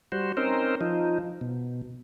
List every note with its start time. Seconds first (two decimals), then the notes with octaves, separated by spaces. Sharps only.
0.12 G3 F#4 C5
0.37 C4 C#4 D#4 A#4 C5
0.81 F3 D#4
1.41 B2